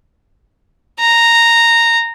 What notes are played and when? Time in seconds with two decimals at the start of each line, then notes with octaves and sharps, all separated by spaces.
1.00 A#5